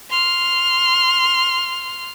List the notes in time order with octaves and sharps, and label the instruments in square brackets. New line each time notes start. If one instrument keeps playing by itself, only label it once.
[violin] C6 F6